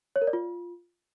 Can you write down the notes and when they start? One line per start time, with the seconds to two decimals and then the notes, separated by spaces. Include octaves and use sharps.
0.16 C#5
0.21 A#4
0.27 D5
0.33 F4